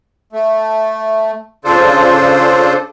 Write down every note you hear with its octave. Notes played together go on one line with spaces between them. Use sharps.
A3
C#3 D4 F4 A4 C5